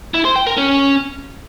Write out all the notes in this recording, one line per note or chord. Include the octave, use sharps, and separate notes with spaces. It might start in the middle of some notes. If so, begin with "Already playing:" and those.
E4
C5
G5
A#4
C#4